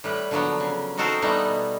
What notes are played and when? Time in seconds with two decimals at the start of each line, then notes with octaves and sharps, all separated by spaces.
0.04 A2 G3 B4
0.31 D3 F3 F#3 A#3 B3
0.60 C#3
0.97 C4 D#4 F#4 A4 A#4 C5
1.22 G3 A3 B3 D#4
1.45 B2